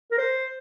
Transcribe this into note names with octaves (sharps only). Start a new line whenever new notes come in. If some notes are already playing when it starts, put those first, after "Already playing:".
A#4
C5